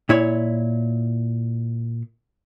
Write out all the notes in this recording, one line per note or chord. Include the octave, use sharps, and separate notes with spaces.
A#2 E4 C#5